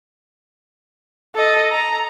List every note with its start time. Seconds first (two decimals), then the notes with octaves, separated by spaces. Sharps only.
1.35 A4 D#5
1.71 A#5